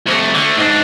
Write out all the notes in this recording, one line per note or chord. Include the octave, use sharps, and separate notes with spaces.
C2 A3
D3 A3
G#2 D4